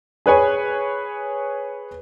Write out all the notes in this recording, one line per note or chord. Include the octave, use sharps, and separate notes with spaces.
G#4 B4 C#5 G#5